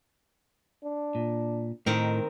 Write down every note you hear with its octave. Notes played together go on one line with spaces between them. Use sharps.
D4
A#2
A2 D#3 C4 D#4 A#4